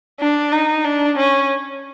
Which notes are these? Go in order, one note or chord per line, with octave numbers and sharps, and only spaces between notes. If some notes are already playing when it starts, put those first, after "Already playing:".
D4
D#4
D4
C#4